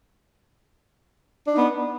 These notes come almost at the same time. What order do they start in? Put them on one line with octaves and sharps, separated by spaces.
D4 D#4 B3